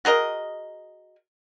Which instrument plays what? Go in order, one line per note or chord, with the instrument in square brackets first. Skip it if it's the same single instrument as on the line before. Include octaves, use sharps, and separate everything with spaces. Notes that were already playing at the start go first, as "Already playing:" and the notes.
[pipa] F#4 G#4 A#4 D#5